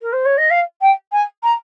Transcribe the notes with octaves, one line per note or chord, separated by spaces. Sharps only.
A#4
C5
C#5
D#5
F5
G5
G#5
A#5